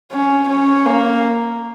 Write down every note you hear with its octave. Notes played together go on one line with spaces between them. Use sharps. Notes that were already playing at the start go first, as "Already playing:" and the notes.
C#4
C#4
A#3